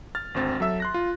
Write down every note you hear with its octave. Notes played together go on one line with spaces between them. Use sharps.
F6 A6
G#1 D2 C4 A6
F#3 A4 E5 E6
C6 F#6 A#6
F4